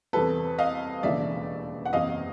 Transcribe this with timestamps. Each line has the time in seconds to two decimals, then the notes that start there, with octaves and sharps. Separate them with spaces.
0.13 E2 C3 E3 G3 A4 B4
0.58 D#5 F5
1.03 E1 D#2 C#3 E3 D5 E5
1.85 F#5
1.93 F#1 E2 C3 D#5 F5